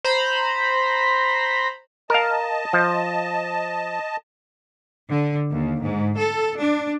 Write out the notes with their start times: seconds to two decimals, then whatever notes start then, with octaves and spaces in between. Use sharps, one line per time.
0.04 C5 A#5 B5
2.10 A#4 D#5 F5 A5
2.73 F3
5.11 D3
5.50 D#2
5.82 G#2
6.16 A4
6.59 D4